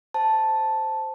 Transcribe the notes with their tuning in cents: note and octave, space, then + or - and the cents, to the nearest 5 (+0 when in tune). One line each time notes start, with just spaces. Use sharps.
C5 +0 A5 +0